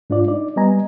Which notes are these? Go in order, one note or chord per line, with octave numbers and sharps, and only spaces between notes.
G#2 D4 F4 D5
D#4 D5
G3 B3 D#5 G#5 A#5